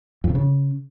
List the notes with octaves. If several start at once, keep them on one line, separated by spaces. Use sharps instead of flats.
F2
C3
C#3